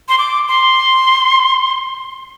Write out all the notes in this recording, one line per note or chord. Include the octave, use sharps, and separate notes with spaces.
C6
D6
C6